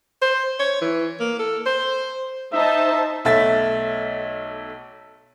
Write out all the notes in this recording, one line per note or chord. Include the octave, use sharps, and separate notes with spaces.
C5
C#5
E3
A#3
A4
C5
D#4 C5 E5 A5
B1 A3 E5 A6